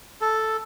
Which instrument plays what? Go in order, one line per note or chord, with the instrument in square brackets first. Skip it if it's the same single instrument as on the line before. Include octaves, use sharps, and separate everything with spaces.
[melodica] A4